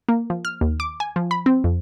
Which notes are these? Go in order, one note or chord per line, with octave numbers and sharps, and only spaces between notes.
A#3
F3
F6
D#2
D6
G#5
F3
B5
C4
F2